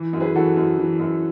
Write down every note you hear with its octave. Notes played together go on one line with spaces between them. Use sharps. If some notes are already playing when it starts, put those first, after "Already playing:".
Already playing: E3
F#2
G#4 B4
E3 F#4 A4
F#2
E3
F#2